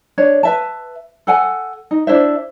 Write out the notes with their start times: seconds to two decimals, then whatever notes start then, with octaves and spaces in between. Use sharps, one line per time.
0.18 D4 C#5
0.43 B4 E5 A5
1.27 A4 F#5 G#5
1.91 D#4
2.07 D4 E4 C5 E5